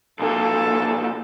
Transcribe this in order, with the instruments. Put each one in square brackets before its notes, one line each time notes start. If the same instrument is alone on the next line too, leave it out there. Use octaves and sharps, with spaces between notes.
[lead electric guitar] B1 A#2 [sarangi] A4